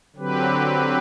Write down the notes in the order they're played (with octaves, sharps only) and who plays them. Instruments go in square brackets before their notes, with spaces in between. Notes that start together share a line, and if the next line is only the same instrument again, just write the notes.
[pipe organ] D3 F#3 C4 G4 B4